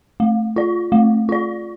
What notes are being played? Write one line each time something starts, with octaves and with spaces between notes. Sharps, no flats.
A3
F4 D5
A3
F4 D5